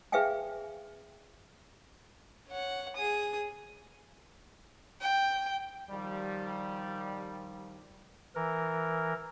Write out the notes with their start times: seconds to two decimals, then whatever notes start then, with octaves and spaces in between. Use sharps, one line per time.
0.12 G#4 B4 E5 F5 G5 G#5
2.48 C#5 F#5
2.96 G#4 D#6
5.01 G5
5.91 D#3 F3 G3
8.35 E3 A#4